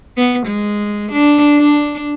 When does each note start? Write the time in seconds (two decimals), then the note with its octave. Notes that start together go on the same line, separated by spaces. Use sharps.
0.17 B3
0.46 G#3
1.12 D4
1.57 D4